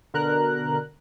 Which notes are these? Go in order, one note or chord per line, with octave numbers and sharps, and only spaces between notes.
B2 D3 A#4 A#5 F#6